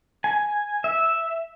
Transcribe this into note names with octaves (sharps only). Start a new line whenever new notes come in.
G#5
E5